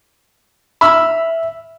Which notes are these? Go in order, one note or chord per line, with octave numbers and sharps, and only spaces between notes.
E5 B5 E6 F6